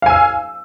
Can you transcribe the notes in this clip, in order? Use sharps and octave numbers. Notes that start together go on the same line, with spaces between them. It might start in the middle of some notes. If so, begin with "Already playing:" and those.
F5 G#5 E6